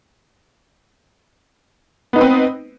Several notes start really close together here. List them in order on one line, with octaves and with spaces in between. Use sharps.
B3 D#4 B4 C4